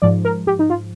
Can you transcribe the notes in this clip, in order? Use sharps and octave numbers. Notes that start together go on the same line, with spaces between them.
G#2 F3 D5
A#4
G4
D#4
F4